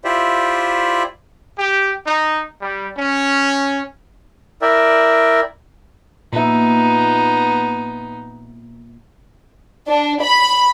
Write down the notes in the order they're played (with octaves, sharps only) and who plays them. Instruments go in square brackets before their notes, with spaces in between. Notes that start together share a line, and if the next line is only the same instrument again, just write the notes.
[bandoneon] E4 F4 G4 C5 D5 E5
[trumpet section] G4
D#4
G3
C#4
[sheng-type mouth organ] E4 A#4 D5 E5 G5
[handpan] A#2 E5 [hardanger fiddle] B3 D#4
[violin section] D4
B5